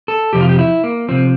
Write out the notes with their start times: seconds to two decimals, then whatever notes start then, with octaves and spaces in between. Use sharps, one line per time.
0.08 A4
0.33 F2 C3 F3 G4
0.41 F4
0.49 G4
0.59 E4
0.84 A#3
1.09 C3 F3 C4